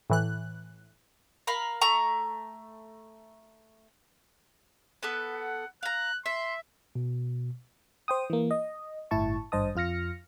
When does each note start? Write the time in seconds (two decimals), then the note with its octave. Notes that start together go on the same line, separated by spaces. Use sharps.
0.10 A2 E3 F#6
1.47 A#4 F5 B5
1.81 A3 A#5 C#6
5.03 B3 A4 B4
5.35 F#5
5.83 F5 A#5 F#6
6.26 E5 C6
6.95 B2
8.08 C5 G5 D#6
8.30 E3 A#3
8.51 D#5
9.11 G1 A2 E4 A5 C#6
9.52 G#1 G2 C5 D#5 A5 D#6
9.76 F2 F4 F6 A#6 C#7